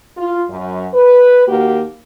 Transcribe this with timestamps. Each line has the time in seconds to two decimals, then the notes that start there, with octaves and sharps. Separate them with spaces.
0.17 F4
0.50 F#2
0.94 B4
1.48 D#2 A#3 F#4 G4